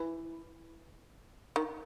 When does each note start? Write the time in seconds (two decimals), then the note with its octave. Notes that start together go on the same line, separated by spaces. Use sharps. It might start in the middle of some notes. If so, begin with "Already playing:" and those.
Already playing: E3
1.56 D#3